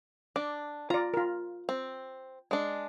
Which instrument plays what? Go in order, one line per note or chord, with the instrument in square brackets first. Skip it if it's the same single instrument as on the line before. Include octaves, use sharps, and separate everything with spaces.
[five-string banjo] D4 [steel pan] D6
[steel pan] F4 D5 [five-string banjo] A#5
[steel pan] F4 A#4
[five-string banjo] C4
G#3 D4